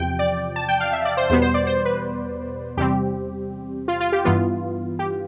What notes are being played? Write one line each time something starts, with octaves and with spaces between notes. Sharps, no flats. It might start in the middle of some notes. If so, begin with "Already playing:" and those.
Already playing: E2 C3 F3 G5
D5
A5
G5
F5
E5
D5
C5
E2 B2 G3 B3 C5
C5
D5
C5
B4
E2 C3 G3 C4 G4
F4
F4
G4
G2 E3 B3 F4
G4